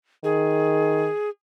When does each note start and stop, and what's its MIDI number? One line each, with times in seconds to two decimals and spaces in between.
0.24 1.08 51
0.24 1.29 68